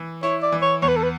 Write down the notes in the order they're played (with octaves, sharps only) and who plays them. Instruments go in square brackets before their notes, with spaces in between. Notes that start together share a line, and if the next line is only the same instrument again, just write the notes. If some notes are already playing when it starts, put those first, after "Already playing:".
Already playing: [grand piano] E3
[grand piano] E4 [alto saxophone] C#5
[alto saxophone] D5
[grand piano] E3
[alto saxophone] C#5
[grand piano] E2 [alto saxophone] C#5
[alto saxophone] B4
A4
B4